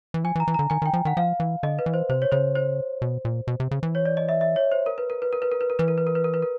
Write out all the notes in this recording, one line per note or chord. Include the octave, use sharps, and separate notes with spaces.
E3
F3 G#5
E3
A#5
E3
D3 A#5
D#3 G#5
D#3
G5
F3
D#3 F#5
F3 F5
E3
D3 D#5
B4
E3
C5
C3 C5
C#5
C#3 C5
C5
B2
A#2
B2
C3
C#3
E3
C#5
D5
D#5
E5
E5
C#5
C5
A#4
B4
A#4
B4
A#4
B4
A#4
B4
A#4
E3 B4
A#4
B4
A#4
B4
A#4
B4
A#4